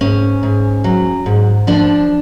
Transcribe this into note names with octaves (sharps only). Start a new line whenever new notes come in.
G#2 C#4
G#2
F#3
G#2
F3 D4